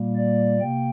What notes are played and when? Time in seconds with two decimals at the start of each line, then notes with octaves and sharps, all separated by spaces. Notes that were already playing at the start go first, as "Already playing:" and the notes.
Already playing: A#2 G3 A#3
0.16 D5
0.60 C3 A#3 G5